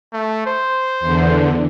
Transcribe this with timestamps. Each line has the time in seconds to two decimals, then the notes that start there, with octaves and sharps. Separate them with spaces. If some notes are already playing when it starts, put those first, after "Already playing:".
0.13 A3
0.46 C5
1.00 E2 D3